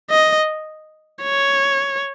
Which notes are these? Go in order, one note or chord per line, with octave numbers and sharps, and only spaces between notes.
D#5
C#5